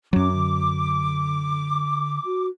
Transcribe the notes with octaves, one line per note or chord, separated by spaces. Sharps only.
F#2 F#3 C#4 D6
D3
F#4